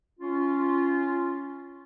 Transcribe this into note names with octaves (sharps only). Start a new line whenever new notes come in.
C#4 F4